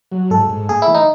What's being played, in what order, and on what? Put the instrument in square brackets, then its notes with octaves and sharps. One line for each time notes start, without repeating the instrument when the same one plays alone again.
[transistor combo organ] F#3
[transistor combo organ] G#2 [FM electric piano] A4
[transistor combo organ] G#2
[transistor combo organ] A3 [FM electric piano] G#4
[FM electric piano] E4
[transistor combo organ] E3
[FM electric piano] D#4